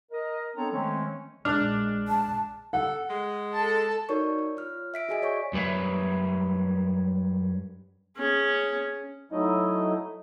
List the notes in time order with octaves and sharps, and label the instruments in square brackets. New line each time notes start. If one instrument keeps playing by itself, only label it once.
[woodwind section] A#4 D#5
B3 C4 D4 A4 C#5 A#5
D#3 F3 G#3 A3 C4 C#4
[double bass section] A#1 G#3 [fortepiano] D4 [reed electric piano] F6 F#6
[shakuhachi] A5
[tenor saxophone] A4 [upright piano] F#5
[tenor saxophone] G#3
[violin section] A4 A5
[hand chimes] D#4 F#4 A#4 C#5 D5 C#6
C#5
F4 F6
E5 B6 D7
F#4 G#4 D#5 G#5 D7
C#5 D5 G#5 C#6
[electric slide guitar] F#2 G3 B4 C#5 E5
[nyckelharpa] C#4 G#4
[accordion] F#3 A3 D#4 E4 D#5